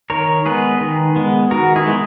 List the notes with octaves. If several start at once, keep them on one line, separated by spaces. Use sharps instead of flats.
D#3 A#4 C#5
G#3 B3 G#4 B4
D#3
G#3 B3
D#3 F#4 A#4
E4 G#4
G#3 B3